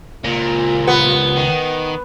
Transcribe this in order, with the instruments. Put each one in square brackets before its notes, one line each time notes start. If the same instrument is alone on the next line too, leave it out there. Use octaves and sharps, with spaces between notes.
[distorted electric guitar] C#2 A#4 [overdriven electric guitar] A#2 [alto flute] F4
[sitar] B3
[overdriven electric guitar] D#3